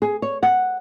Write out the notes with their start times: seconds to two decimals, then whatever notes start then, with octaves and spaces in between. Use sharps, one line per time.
0.02 G#4
0.22 C#5
0.43 F#5